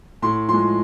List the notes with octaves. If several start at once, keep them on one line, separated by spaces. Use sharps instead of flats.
A2 C6
F3 C6
G#3